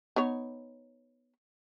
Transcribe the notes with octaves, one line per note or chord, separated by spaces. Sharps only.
B3 D#4 C#5